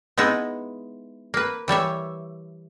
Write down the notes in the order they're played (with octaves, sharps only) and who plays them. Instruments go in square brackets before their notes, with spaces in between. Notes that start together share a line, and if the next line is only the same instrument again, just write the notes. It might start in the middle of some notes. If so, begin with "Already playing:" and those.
[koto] G#3 B3 D#4 E4
A#3 B4
E3 G3 C#5 E5